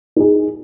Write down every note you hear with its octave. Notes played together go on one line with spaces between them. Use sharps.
D#4 G#4